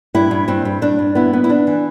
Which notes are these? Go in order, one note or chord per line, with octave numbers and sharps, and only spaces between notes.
G2 E4
G2
G2 C4
G2
G2 D4
G2
B3 E4
B3
E4
E3 D4
E3